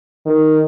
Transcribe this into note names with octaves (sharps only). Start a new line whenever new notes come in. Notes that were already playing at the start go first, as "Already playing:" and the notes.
D#3